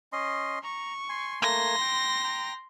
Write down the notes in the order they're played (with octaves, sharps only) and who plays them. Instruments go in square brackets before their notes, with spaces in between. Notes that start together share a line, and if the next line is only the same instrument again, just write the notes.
[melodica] C#4 D#5 C6
[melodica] A#5 [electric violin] C#6
[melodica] G#5 C6
[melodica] A3 A#3 G#5 [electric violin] C6 A#6
[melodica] G5
G5 A#5